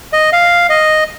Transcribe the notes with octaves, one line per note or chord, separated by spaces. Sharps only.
D#5
F5
D#5